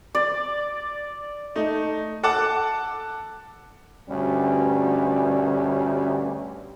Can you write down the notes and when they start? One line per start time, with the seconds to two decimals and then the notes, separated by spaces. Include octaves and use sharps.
0.15 D5
1.55 A3 D#4
2.23 A4 F#5 A5 D6
4.08 D2 G2 B2 G3 C#4